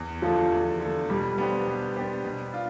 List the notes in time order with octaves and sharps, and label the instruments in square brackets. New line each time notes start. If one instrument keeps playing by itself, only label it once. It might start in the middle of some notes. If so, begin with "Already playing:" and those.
Already playing: [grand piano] E2
[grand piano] D3 A3 [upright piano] F3
[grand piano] E2
D3 A3
[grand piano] B2 [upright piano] G3
[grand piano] B3 D4 G4 C5
B2
B3 D4 G4 C5
B2
D4 F4